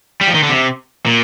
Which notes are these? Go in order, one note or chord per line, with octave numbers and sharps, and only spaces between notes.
G3
F3
D#3
D3
C3
A#2